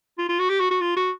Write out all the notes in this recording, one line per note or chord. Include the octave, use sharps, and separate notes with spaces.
F4
F4
F#4
G4
F#4
F#4
F4
F#4